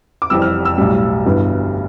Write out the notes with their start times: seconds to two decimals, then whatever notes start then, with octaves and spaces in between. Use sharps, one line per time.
0.22 D6
0.30 F1 F2 E3 G3 C4 E6
0.42 F6
0.65 E6
0.78 B1 A2 G3
1.26 G1 G2 E3 B3